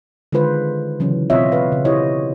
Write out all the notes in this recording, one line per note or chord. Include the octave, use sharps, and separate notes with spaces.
D3 D#3 G#3 F4 B4 C5
C#3 E3 F#3 C#4
B2 C4 F4 C#5 D#5 E5
B4 F5
C#3
E4 G4 C5 C#5 D#5